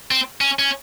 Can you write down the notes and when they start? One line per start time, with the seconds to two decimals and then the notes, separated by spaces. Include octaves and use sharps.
0.11 C4
0.41 C#4
0.59 C#4